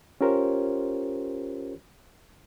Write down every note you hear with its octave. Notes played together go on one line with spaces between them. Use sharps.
C#4 F4 G4 A#4 C5 C#5